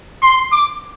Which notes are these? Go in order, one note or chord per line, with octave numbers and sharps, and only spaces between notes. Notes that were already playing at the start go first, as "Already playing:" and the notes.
C6
D6